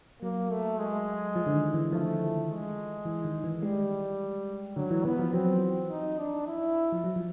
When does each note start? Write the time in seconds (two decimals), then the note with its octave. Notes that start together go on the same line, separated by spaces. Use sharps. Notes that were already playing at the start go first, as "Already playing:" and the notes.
0.22 F#3 A#3
0.50 A3
0.79 G#3
1.36 F3
1.46 D3
1.54 D#3
1.74 E3
1.92 F3 A3
2.49 G#3
3.05 E3
3.25 D#3
3.44 E3
3.62 G3 G#3
4.76 D3 F#3
4.91 E3
5.05 E3 B3
5.19 F3
5.33 F#3 C4
5.90 D#4
6.19 D4
6.47 E4
6.92 F3
7.04 F#3
7.16 F3